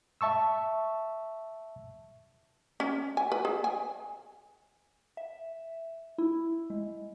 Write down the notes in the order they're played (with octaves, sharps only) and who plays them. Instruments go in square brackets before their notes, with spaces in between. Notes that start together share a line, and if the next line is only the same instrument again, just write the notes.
[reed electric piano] E5 A5 C#6 E6
[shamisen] C#4
G#5
B4
G#4
G#5
[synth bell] E5
E4
G#3